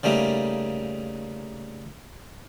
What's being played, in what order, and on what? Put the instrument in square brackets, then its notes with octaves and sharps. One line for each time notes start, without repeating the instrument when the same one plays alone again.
[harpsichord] C#3 G3 A3 A#3 D#4